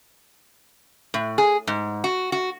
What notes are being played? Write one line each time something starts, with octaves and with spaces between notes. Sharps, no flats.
A2
G#4
G#2
F#4
F#4